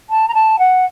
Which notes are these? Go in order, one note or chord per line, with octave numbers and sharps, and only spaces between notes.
A5
A#5
A5
F#5